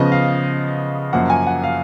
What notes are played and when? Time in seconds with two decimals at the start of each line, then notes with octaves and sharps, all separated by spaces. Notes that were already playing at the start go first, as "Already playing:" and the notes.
Already playing: C#3 F3 B3 D#5
0.12 F5
1.13 F#2 F3 A#3 F#5
1.30 G#5
1.47 F#5
1.64 F5